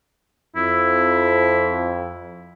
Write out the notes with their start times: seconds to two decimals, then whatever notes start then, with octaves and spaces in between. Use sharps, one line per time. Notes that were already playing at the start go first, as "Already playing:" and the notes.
0.56 F2 E4